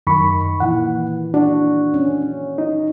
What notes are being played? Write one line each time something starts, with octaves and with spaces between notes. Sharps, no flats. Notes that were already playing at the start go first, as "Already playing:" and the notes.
F#2 D#3 B5 C#6
A#2 E3 F#5
D4 F#4
C#4
D#4